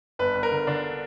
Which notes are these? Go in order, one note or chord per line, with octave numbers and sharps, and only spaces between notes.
G1 B4
G1
A#4
D3
D3 D4